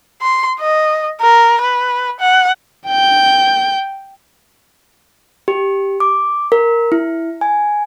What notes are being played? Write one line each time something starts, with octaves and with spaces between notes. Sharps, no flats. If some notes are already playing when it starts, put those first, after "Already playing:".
C6
D#5
A#4
B4
F#5
G5 G6
G4
D6
A#4
E4
G#5